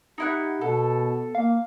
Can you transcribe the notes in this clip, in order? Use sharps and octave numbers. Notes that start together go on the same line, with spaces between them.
D#4 E4 G4 F#5
B2 B3 A4
A#3 F5